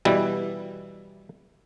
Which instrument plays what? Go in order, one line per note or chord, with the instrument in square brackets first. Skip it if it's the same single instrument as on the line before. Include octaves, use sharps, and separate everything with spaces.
[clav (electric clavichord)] B2 E3 G3 E4